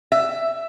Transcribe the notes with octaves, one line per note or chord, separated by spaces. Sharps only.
E5